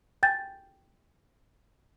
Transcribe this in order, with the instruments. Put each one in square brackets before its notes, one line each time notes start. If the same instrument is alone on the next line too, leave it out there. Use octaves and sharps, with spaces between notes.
[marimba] G5 G#5 G6 A6